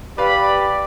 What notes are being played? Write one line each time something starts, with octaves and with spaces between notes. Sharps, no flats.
G4 B4 D5 F5 B5